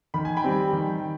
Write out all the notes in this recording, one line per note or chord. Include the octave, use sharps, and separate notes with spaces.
D#3 B5
G#5
G5 B5
G3 C4
D#3